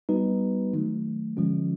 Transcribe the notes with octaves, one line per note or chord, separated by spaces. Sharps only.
G3 B3 D#4 F#4 B4
D#3 F#3 A3
D3 F3 G#3 C#4 F4